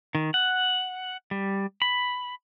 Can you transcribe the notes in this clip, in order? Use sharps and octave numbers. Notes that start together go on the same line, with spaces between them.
D#3
F#5
G3
B5